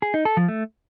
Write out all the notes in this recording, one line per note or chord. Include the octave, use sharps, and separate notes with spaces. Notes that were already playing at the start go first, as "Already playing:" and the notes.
G#4
D#4
A4
F3
A3